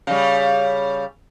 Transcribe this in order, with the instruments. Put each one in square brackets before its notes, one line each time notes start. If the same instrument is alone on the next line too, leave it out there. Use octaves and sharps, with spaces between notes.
[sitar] C#3 G3